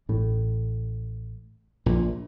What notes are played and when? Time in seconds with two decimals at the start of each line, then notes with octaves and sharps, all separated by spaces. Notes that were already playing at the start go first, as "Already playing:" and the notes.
0.09 A1 A2
1.86 A#1 A#2